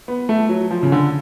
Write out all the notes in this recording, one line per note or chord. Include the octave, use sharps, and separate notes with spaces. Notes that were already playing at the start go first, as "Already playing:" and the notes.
B3
A3
F#3
F3
C#3
D3